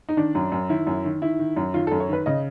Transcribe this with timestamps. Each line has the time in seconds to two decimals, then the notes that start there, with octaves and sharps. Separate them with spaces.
0.09 D#4
0.17 D#3 D4
0.35 F#2
0.52 F#2
0.69 D#3 E4
0.87 F#2
1.04 D#3
1.22 D#3 E4
1.39 D#3
1.57 F#2
1.74 D#3 F4
1.87 A4
1.92 F#2
2.00 C#5
2.09 D#3 B4
2.26 C#3 D#5